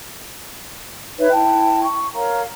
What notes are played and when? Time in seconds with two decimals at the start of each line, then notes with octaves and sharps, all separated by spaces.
1.18 D#4 B4 C#5 E5
1.31 E4 G5 A5
1.84 C#6
2.14 A#4 C#5 F5 A#5